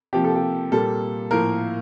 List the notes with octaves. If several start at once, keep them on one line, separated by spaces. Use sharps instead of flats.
C3 F3 A#3 G4
A4
G4
A#2 G3 A#3 A4
A2 F3 A#3 A#4